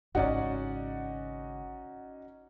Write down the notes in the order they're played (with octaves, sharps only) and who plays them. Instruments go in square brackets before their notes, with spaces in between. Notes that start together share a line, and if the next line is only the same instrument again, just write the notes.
[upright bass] G#1 C#3 [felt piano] C#4 D#4 F#4 [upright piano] D5 F#5